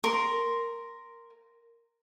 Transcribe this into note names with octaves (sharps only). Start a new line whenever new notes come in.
A#4 C6